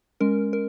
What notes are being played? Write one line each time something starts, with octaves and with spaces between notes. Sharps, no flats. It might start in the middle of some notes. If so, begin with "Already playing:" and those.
G#3 C#4 A#4
A#4